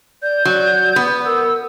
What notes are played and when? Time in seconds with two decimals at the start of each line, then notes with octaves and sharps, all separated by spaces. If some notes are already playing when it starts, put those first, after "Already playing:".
0.23 D5 G6
0.45 F#3 D5
0.96 B3
1.26 A#4 E6